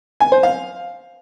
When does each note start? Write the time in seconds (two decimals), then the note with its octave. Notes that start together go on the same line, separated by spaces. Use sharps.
0.20 G#5
0.32 C5
0.43 F5